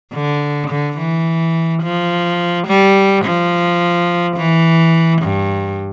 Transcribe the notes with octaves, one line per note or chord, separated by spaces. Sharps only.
D3
D3
E3
F3
G3
F3
E3
G2